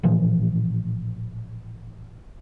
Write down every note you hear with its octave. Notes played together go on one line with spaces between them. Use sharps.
A1 A#2 E3 F3